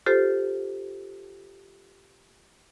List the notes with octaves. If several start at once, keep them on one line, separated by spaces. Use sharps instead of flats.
F4 G4 A4 C5